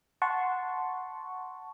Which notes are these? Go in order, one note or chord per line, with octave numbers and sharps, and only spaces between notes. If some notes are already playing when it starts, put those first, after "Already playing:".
F#5 A5 C6 C#6